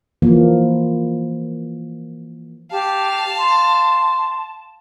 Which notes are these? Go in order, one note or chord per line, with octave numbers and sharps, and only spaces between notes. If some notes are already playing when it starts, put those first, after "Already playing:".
E3 F3 A#3
G4 F5 A5
C6